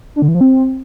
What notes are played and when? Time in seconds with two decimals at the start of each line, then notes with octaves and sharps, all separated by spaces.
0.16 D4
0.22 D3
0.28 E3
0.35 F3
0.41 C4